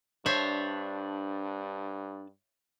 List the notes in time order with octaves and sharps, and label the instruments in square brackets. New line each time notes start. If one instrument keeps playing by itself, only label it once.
[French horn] G2 [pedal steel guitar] D4 A5 [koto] C5 C#5 E5